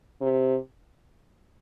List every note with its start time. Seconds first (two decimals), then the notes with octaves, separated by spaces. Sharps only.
0.21 C3